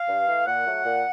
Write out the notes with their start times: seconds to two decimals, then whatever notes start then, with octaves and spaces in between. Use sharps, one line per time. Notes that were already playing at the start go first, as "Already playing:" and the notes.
Already playing: F5
0.08 G2
0.28 E3 A3
0.47 A#2 F#5
0.66 F#3 A3
0.85 A#2